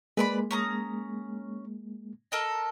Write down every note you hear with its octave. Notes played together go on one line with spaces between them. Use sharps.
G#3 A#3 B4 D5 B5
C#4 A#5 D#6
A4 A#4 D#5